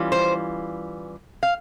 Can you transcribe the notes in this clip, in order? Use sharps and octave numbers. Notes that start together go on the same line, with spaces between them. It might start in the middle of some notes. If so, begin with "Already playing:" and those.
Already playing: E3 G3 C#4 F4
C5
F5